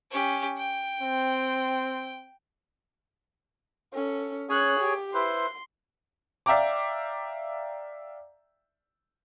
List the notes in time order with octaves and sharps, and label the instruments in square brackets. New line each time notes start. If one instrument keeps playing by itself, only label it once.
[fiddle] C#4 G4
G5
[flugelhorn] C4
[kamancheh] C#4 A4
[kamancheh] C#4 F#6 [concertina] G#4 C#5 G#5
[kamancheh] G4
[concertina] E4 B4 C5 [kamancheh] C6
[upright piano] D5 E5 F5 G5 A#5 D6